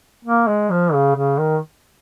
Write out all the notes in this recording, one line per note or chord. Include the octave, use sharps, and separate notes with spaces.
A#3
G#3
F3
C#3
C#3
D#3